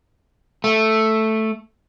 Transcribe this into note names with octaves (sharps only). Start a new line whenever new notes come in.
A3